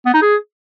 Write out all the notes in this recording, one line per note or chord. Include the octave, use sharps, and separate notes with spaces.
B3
D#4
G#4